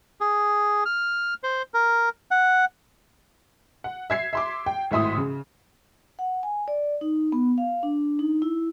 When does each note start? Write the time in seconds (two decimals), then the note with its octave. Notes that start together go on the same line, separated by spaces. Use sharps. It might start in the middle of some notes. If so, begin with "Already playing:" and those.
0.21 G#4
0.86 F6
1.43 C5
1.74 A#4
2.31 F#5
3.84 F#5
4.10 E5 G#6 C7
4.33 E5 C6 D6
4.66 G5
4.91 G#1 A2 E5 C6 D#6
5.17 C#3
6.19 F#5
6.43 G#5
6.68 D5
7.01 D#4
7.32 B3
7.58 F5
7.83 D4
8.19 D#4
8.42 E4